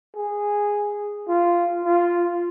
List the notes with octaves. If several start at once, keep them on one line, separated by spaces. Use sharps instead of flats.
G#4
F4
F4